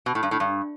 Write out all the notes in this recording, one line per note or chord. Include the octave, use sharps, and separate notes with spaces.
B2
A2
G2
A2
G2